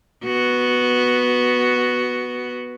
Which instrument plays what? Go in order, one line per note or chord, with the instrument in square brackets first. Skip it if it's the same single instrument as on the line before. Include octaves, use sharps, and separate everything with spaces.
[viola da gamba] B3 F#4